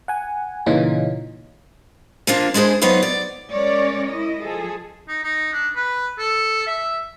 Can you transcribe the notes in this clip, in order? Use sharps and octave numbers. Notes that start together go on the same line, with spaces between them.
F#5 G#5
A#2 C#3 E3 C#4 D#4 F4
F3 A#3 D4 F4
G#3 D4 E4 G#4 C5
F#3 B3 D#4 F4 B4 C5
D5
G#3 C#4 A#4 C#5 D5
E4 D#5
F3 G#4 A4
D#4
D#4
D4
B4
A4
E5